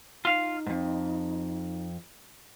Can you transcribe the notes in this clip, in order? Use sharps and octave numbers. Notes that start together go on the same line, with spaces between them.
D#4 F4 F5
F2 G#2